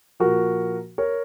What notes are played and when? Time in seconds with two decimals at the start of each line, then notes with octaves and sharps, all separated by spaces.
0.20 A#2 F3 F#4 A#4
0.98 A#4 C#5